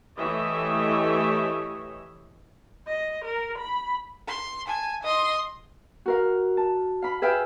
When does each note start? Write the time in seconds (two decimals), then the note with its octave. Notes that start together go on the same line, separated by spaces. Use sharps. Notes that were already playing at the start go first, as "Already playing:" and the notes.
0.17 E3 A3 G4 C#5 D#5 E5
2.87 D#5
3.25 A#4
3.59 B5
4.28 C6
4.67 G#5 A5
5.03 D#5 C6
6.06 F#4 A#4 F5
6.57 A5
7.02 F5 B5
7.22 G#4 B4 E5 F5 G5 F6